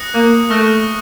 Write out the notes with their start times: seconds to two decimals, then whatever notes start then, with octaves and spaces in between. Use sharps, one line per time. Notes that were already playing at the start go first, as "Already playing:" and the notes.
Already playing: D#6 F#6 A#6 C#7
0.14 A#3
0.50 A3 C#6 F6 A#6